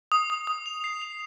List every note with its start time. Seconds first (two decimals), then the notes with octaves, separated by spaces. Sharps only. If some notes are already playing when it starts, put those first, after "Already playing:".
0.12 D#6
0.30 D#6
0.47 D#6
0.66 F7
0.84 C7
1.02 F7